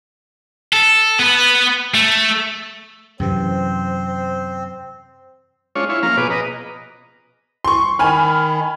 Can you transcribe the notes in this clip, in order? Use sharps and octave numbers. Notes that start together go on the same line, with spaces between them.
A4
B3 B4
A3
F#2 C3 E3 C4 C5
G#3 C#4 D4 F4 C#5
E4 F4 C#5
F3 A#3 C#4 F5 A#5
B2 G#4 B4 D6
B4 D#5 A#5
C6 C#6
D#3 G#5 B5 F6